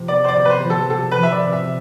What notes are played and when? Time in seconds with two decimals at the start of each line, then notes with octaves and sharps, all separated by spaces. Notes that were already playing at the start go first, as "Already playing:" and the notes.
Already playing: C3 F3
0.08 B3 D5
0.24 C5
0.28 D5
0.35 C3
0.45 B4
0.50 C5
0.63 F3
0.70 A4
0.90 C3 A4
1.11 B4
1.19 F3 E5
1.32 D5
1.46 C3
1.52 E5